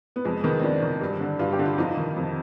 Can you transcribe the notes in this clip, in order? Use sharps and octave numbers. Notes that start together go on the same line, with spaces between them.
B3
F2 G#3
D#3 B3
C4
F2 D4
D#3
G2
D3
G2 F4
G4
D3
F4
F2 D#4
D#3
F2